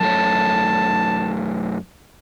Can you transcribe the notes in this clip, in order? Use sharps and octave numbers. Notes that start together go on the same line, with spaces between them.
F#2 A3 C#5 A5